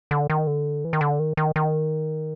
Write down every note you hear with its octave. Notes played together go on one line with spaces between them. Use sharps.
D3
D#3
D3
E3
D#3
D3
D#3
D#3
D#3